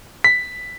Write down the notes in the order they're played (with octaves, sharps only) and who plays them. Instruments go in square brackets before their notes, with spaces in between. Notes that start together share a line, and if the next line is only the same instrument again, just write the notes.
[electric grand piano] B6